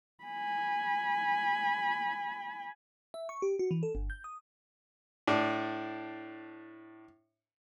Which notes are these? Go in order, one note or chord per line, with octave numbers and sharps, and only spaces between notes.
G#5 B5
E5
C#6
G4
F#4
E3
A4
G1
G6
D#6
A2 D4